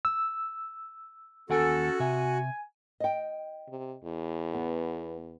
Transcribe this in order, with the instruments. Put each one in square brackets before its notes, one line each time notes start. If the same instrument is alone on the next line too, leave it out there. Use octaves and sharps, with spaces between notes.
[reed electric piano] E6
[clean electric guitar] D#2 F#5 G#5 [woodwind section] C#4 A4 [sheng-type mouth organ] F#4
[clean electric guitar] C3 E5 [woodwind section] G#5
[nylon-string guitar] D#5 G5
[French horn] C3
E2
[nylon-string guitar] B3